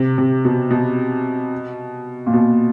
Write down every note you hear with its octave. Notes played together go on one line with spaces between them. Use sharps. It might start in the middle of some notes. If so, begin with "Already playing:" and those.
Already playing: C3
C3
B2
B2
A#2
B2